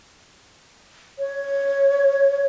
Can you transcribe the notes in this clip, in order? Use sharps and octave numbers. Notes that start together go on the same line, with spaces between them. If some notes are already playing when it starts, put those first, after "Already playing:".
C#5